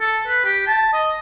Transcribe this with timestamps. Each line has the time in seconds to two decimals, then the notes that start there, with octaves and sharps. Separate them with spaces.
0.01 A4
0.27 B4
0.45 G4
0.67 A5
0.93 D#5